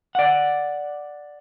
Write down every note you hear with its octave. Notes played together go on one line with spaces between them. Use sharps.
D5 F#5